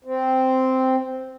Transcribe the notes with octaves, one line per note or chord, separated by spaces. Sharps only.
C4